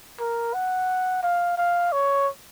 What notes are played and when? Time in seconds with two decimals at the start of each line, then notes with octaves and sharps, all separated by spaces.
0.19 A#4
0.54 F#5
1.23 F5
1.58 F5
1.92 C#5